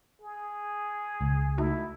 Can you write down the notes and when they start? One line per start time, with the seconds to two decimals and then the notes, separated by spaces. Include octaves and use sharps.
0.21 G#4
1.21 C#2
1.58 A3 D#4 E4 F#4